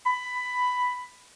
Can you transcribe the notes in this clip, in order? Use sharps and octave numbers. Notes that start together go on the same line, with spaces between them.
B5